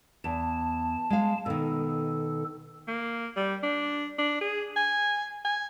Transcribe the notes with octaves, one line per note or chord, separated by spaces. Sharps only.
E2 A5
G#3 F5
B2 D#3 A4
A#3
G3
D4
D4
G#4
G#5
G#5